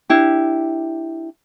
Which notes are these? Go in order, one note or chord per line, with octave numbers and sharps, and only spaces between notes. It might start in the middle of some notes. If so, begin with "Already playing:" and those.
D4 E4 G4